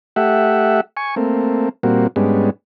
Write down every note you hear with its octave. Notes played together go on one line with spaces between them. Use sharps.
A3 G4 E5 F#5
G#5 C#6
A3 A#3 C4
A#2 G3 A#3 C4 F#4
G#2 G3 G#3 B3 C#4 D4